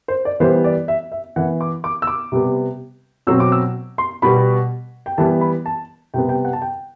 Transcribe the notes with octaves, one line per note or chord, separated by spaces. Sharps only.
C5
D5
E3 G3 B3 C5
D5
E5
E5
E3 B3 F#5
D6
D6
E6
D6
C3 G3 B3
B2 F#3 C4 E6
D6
E6
C6
B2 G3 B3 B5
G5
E3 G3 B3 A5
B5
A5
C3 G3 B3 G5
G5
F#5
A5
G5